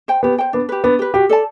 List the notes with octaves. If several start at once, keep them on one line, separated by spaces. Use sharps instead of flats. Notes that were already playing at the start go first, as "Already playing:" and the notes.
C5 G5
B3 G4
C5 G5
B3 D4
G4 B4
B3 D4
G4 B4
F#4 G4
A4 D5 A5